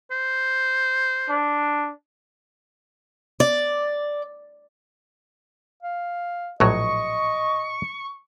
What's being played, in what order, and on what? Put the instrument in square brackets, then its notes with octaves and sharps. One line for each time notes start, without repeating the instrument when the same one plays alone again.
[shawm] C5
[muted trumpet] D4
[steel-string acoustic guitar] D5
[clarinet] F5
[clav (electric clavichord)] A#1 A2 F#3 [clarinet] D#5 [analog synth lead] C#6